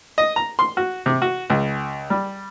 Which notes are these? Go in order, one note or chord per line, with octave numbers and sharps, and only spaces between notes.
D#5
A#5
C6
F#4
C3
F#4
C#2
G3